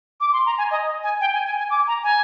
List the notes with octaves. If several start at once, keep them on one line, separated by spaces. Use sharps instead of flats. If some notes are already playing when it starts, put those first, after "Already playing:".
D6
C6
A#5
G#5
D#5
G#5
G5
G#5
G#5
G#5
D6
A#5
G#5